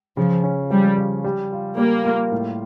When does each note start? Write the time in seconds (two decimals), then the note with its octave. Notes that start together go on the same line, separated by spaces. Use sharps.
0.17 C#3 F3
0.44 C#4
0.70 F3 G3
0.98 F3
1.24 G3
1.52 F4
1.78 G3 A#3
2.05 F4
2.32 A2